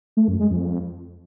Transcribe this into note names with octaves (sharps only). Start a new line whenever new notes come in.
A3
F#2
G#3
F2